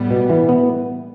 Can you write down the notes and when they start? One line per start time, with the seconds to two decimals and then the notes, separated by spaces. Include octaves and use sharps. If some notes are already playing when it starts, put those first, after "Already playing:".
Already playing: A2 G3 B3
0.11 B2
0.30 E3
0.49 B3